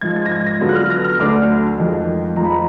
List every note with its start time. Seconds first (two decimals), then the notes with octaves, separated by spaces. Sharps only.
0.01 G#2 F3 G#3 G#6
0.16 G#6
0.26 A#6
0.32 G#6
0.46 A#6
0.60 D3 F#3 B3 F4
0.69 F#6
0.75 F6
0.90 A#6
1.04 F6
1.19 D2 D3 F#3 D4 D6
1.77 F2 D#3 G#3
2.36 F2 F3 G#3 A#5
2.45 B5
2.53 A#5